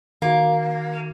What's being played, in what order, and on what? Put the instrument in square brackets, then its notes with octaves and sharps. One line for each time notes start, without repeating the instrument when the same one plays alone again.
[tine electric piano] D#3 F#4 [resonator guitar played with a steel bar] A#3